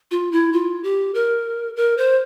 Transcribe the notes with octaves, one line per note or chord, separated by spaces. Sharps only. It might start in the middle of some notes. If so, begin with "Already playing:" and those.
F4
E4
F4
G4
A#4
A#4
C5